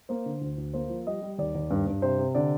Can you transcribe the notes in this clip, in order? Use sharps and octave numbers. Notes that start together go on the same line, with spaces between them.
A#3 C5
D3
D2
D2
A#3 C5
F3
G3 D#5
G3
D#2 D5
D#2
G2
G2
C3 C5
C3
D3 D5